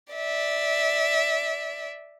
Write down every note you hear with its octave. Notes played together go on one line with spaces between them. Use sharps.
D5 E5